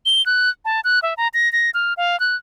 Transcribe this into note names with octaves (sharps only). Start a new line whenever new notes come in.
G7
F#6
A5
F#6
E5
A#5
A#6
A#6
F6
F5
F#6